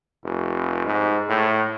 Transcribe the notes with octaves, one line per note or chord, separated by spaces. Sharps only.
F1
G#2
A2